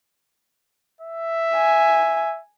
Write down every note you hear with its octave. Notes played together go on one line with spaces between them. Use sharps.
E5
G#5